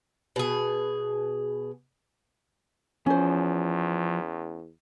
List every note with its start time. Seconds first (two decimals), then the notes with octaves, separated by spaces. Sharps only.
0.36 B2 G#4
3.06 E2 F3 C#4 C5